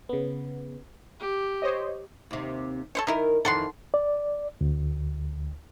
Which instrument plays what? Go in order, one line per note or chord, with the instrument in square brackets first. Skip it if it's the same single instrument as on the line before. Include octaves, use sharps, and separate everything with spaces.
[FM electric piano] C#3 B3
[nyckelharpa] G4
[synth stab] C5 C#5 D#5
[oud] D#2 C3
[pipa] A4 C5 C#5
[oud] D#3 A#4 [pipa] D#4 E4
[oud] F2 D#3 E3 [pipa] A4 F#5 C6
[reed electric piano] D5
D2